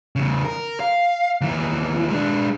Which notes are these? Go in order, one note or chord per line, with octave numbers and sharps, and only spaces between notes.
E2 C#3
A#4
F5
D#2 E3
G#3 D4